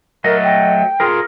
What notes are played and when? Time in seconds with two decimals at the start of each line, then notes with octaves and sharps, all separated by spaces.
0.24 F#3 A3 A#4 D#5
0.43 G5
1.00 F4 G#4 A#4